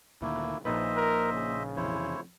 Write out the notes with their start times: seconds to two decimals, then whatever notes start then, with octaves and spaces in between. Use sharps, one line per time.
0.22 D2 A#2 D#3 A3 A#3 E4
0.65 A#1 A#2 D#4 B4 C5 D#5 E5
0.96 A#4
1.33 C#3
1.76 F2 C3 E3 E4 C5 C#5